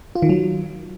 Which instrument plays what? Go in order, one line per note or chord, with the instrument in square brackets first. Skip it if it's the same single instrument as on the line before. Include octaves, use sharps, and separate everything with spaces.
[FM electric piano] F4
D#3
F#3